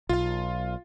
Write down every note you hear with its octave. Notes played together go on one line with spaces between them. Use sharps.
B1 F4 F5